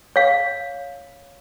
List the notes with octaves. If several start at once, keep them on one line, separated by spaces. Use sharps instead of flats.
C#5 F5